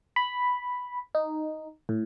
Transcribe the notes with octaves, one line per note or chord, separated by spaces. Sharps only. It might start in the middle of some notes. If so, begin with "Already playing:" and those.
B5
D#4
A2